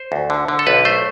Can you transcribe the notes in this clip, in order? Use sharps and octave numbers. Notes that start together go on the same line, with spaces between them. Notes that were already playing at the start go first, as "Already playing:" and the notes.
Already playing: C5
D2
D3
D3
A4
B1 B4
A3 C5